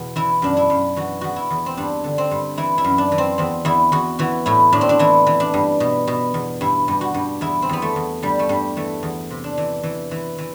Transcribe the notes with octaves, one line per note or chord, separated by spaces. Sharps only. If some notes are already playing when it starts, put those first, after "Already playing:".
Already playing: E2 B2
E3 E4
F#2 D4
E4
F#2
E3 F#4
E2 F#4
E4
E2
C4
G2 D4
D3
C4
G2
E3 E4
E4
F#2
D4
E3
C4
E2 C4
E2 E4
E2 F#4
E3 F#4
A2 E4
A2 D4
C4
D4
E3 E4
E3
D4
G2
B2
B2
E2
G2 E4
G2
F#4
G2
E2 E4
C4
E2 B3
A3
E2
G2 G3
A3
G2 G3
E3 A3
E2
C3
D4
E3
E3
E3
E3